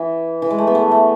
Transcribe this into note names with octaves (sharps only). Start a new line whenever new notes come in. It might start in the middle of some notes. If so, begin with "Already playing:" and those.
Already playing: E3
E3
G#3
A3
B3
A3
A3